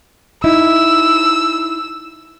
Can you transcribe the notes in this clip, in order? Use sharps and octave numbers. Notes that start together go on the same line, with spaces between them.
D#4 E4 E6